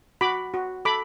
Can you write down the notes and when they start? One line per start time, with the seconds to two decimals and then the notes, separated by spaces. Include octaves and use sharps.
0.21 F#4 B5 D6
0.54 F#4
0.85 A4 B5 D6